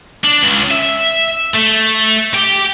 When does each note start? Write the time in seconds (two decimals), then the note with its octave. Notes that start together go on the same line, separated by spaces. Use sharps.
0.24 D4
0.43 C#2
0.71 E5
1.55 A3
2.34 G4